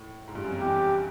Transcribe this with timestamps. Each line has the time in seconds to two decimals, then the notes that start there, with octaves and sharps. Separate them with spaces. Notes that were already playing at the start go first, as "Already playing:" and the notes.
Already playing: A2
0.28 G#2
0.35 G2
0.44 F#2
0.52 F2
0.60 E2 G4